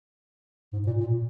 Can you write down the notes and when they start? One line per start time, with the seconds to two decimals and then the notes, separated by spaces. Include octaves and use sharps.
0.73 G#2
0.87 A#2
1.00 A#2